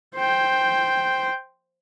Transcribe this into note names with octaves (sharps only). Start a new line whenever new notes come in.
C5 G5